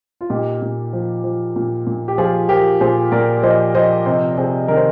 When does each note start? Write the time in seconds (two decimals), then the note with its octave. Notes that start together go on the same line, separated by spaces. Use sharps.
0.21 F4
0.30 A#2 D#4 G4
0.62 A#2
0.93 F3
1.24 F3
1.56 A#2
1.87 A#2
2.08 G4
2.18 F3 F4 G#4
2.49 F3 G4 A#4
2.81 A#2 G#4 C5
3.12 A#2 A#4 D5
3.43 F3 C5 D#5
3.75 F3 C5 D#5
4.06 C3 C5 D#5
4.31 D5
4.37 C3 G#4 C5
4.68 D#3 A#4
4.77 C5